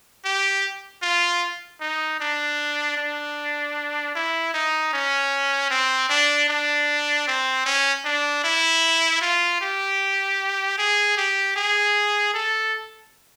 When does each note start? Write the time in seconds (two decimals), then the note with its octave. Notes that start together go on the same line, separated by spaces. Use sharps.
0.25 G4
1.02 F4
1.81 D#4
2.20 D4
2.98 D4
4.15 E4
4.54 D#4
4.93 C#4
5.71 C4
6.10 D4
6.49 D4
7.28 C4
7.66 C#4
8.05 D4
8.44 E4
9.22 F4
9.61 G4
10.78 G#4
11.17 G4
11.56 G#4
12.34 A4